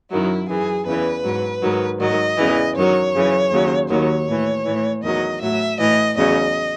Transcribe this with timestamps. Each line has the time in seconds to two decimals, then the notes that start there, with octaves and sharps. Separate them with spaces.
0.10 F#2 D#3 F#3 E4
0.48 F#2 E3 G#4
0.86 E2 C#3 E3 B4
1.23 G#2 F#3
1.61 G#2 D#3 F#3
1.99 G#2 D#3 F#3 D#5
2.37 E2 C#3 E3
2.75 F#2 D#3 F#3 C#5
3.14 F#2 C#3 E3
3.51 D#2 C#3 F#3
3.89 D#2 D#3 F#3 C#5
4.27 A2 E3
4.65 A2 E3
5.02 E2 D#3 F#3 D#5
5.41 A2 F#3 E5
5.79 A2 E3 D#5
6.16 E2 C#3 F#3 D#5